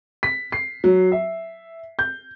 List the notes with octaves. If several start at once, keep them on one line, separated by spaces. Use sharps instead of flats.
B6
C7
F#3
E5
G6